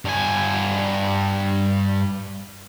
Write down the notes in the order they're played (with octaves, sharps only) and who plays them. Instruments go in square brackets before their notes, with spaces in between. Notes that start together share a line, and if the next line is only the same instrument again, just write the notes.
[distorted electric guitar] G2 G#5